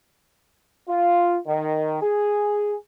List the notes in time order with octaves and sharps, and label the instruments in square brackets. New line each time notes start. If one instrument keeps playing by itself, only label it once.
[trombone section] F4
D#3
G#4